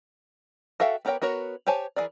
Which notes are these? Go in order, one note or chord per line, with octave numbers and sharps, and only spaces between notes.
F#4 A4 E5 F5 G5
B3 G4 A#4 C#5 G5
B3 F#4 A#4 C#5
G4 C5 C#5 G#5 A5
E3 F#3 G#4 A#4 D5